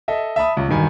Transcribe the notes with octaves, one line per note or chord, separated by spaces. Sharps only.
A4 D#5 E5
E5 A5 B5 D#6
C#2
E1 G2 D#3 G#5 B5